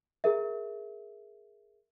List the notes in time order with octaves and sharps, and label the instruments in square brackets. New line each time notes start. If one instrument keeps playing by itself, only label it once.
[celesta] G#4 A#4 E5